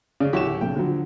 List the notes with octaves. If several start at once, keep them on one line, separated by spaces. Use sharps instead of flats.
C#3 G#4 D5
D1 E4 F#4 G4 C#5 E7
B1 C#3 G5
D3 F3 F#3